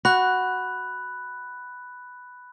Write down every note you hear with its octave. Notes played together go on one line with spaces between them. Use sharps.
F#4 B5 F#6